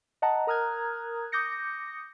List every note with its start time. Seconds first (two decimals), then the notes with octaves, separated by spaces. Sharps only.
0.22 D#5 F#5 A5 A#5
0.47 A#4 A#5 D#6 F6 F#6 G#6
1.32 D6 D#6 G6 A#6 C#7